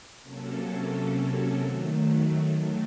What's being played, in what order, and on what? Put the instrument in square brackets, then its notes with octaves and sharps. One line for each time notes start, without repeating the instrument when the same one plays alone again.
[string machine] C3 F#3 A#3 C#4 A4
D#3 F#3 A3